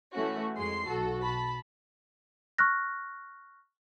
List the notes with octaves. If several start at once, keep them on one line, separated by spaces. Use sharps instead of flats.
E3 A3 C#4 F#4
F2 G#3 C6 C7
B1 F#4 A4
A5 B5
C#6 F6 F#6 A#6